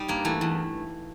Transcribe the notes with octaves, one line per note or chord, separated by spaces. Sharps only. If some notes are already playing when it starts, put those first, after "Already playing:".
Already playing: G3 D#4
G2 A#3
E3 A3
E2